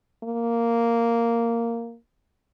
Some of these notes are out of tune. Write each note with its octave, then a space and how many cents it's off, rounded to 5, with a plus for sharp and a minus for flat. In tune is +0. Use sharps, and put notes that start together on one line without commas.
A#3 -5